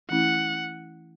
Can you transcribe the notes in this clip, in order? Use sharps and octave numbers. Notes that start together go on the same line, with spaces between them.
E3 A3 C#4 E4 F#5